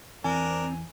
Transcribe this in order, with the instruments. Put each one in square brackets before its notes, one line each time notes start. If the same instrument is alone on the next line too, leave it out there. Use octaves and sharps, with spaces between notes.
[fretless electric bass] E2 E3 [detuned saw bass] C4 [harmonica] D4 A#4 [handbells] G#5